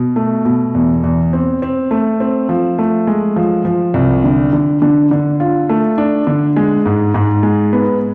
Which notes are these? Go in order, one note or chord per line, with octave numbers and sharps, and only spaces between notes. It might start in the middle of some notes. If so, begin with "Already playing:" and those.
Already playing: B2
A3
B2
E2
E2
C4
C4
A3
C4
F3
A3
G#3
F3
F3
C2
D3
D3
D3
D3
F4
A3
D4
D3
G#3
G#2
G#2
G#3
B3